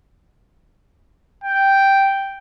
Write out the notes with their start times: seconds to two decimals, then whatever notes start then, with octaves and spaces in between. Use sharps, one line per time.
1.44 G5